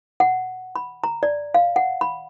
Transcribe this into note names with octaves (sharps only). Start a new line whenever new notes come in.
F#5
B5
A#5
D5
F5
F#5
B5